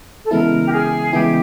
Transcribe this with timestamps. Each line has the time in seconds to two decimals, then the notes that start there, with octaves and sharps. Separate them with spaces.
0.24 A4
0.31 C#3 E3 G#3 B3 E4 A#4
0.65 G4
0.72 G#4
1.13 C#3 E3 G#3 B3 E4 G4